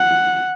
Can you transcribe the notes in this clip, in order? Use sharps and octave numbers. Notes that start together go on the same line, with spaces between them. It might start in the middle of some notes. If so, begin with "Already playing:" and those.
Already playing: F#5